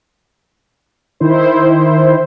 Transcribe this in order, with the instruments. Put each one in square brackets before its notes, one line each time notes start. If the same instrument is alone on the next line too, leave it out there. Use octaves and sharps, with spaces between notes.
[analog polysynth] D#3 E4 C5